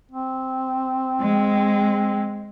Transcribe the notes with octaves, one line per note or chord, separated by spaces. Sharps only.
C4
G#3